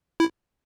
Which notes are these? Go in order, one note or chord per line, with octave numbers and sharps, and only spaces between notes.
E4